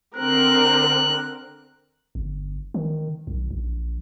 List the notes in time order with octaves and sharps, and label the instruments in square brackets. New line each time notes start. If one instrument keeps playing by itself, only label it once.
[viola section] D3 C4 A#4 [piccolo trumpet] F#6
[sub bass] G1
D#3
B1
A#1